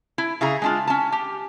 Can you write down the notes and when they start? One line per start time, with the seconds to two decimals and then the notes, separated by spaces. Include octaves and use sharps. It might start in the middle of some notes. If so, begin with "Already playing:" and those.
0.18 E4
0.41 C#3 E4 G#4 A#5
0.62 G#3 D4 F4
0.87 C#4 A5
1.12 G4